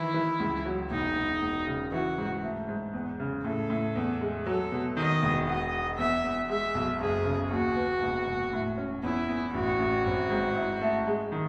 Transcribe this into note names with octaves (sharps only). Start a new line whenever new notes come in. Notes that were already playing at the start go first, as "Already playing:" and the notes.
Already playing: D#3 E3 E4
E3
C#2
F#3
E1 D#4
E1
E1
C#3
E3 F#4
G#2
A3
G#2
E2
C#3
A2 A4
A2
E2
G#3
F#3 A4
B2
D#3 D#5
E1
F#4 D#5
F#4
E2 E5
E2
G#3 E5
B1
F#1 G#4
C#3
D#2 F#4
B3
E1
E1
A2
C#4
E2 E4
E2
A1 F#4
A1
G#1
G#2
E4
A3
G#3
D#3